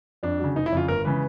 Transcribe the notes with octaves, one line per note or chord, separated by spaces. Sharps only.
F2 D4
C#3 F#3
F1 D#4
E4
F2 C#3 F4
G1 A#4
C#3 E3 G#3 B4